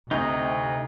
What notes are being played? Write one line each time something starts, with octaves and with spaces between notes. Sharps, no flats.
D2 C3 D#4 D#5